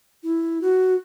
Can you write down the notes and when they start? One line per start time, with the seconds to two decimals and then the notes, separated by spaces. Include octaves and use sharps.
0.23 E4
0.62 F#4